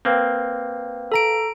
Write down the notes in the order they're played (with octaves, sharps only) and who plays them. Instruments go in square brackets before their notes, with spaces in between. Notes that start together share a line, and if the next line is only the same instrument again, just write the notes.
[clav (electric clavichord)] A#3 C4 [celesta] B4 F5 G5
[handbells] A4 A#5 D7